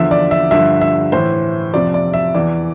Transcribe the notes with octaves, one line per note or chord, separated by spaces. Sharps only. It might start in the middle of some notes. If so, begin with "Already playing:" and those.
Already playing: E2 D3 F3 E5
D5
E5
G2 D3 F3 E5
E5
A2 E3 C5
F2 C3 F3 D5
D5
E5
E2 E3 D5